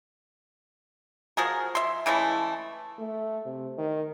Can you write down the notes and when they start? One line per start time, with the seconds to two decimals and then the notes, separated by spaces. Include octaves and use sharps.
1.37 F3 F#4 G#4 A#4
1.75 E5 C6
2.06 C#3 E3 G#3 A3
2.98 A3
3.45 C3
3.78 D#3